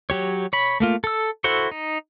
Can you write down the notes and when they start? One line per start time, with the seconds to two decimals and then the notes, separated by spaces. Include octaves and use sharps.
0.10 F#3 G4 C#5
0.53 C#5 B5
0.80 A3 A#3 F4
1.04 A4 E6
1.44 E4 F#4 A4 C5 C#6
1.71 D#4